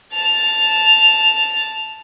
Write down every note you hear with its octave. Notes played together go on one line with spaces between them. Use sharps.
A5 F7